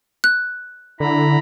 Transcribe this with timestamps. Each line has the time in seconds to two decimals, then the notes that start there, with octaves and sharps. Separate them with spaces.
0.24 F#6
1.00 D3 E4 A#5 B5